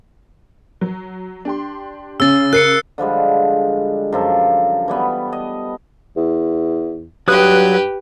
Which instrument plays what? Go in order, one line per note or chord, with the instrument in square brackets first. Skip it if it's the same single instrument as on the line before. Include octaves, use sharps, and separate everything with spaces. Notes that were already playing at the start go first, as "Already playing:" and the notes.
[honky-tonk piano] F#3
D4 G4 C6
[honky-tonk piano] C#3 [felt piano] C#4 [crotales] E6 A6
[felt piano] A#4 [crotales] F#6 C7 C#7
[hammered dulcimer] D3 F3 G3 G#3
F#2 F3 A4
E3 G3 B3
D#5
[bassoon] E2
[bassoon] G2 [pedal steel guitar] F#3 D#6 F#6 [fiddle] G4 B4